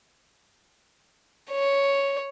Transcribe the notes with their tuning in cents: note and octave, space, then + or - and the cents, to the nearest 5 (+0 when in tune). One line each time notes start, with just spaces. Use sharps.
C#5 +0